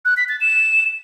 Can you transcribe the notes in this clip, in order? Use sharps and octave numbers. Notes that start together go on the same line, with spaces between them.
F#6
B6
A6
E7